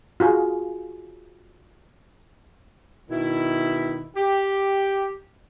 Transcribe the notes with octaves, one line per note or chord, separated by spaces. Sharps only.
F4 F#4 G#4
B2 D#3 E4
G4